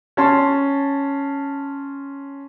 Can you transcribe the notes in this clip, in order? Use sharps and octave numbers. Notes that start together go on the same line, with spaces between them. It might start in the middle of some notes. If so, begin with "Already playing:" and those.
C#4 A5 C6